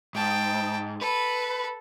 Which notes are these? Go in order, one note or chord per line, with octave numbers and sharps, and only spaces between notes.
G#2 G5 A5
A4 B4